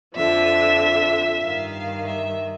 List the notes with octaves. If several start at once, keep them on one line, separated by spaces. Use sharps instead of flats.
F2 D3 F3 E5
G2 D#3 F5
E5